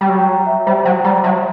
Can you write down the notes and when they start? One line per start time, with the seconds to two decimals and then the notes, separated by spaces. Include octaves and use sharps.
0.01 G3
0.08 F#3 G5
0.28 A#5
0.46 E5
0.67 G3 C5
0.85 F#3 G5
1.04 G3 A#5
1.24 F#3 E5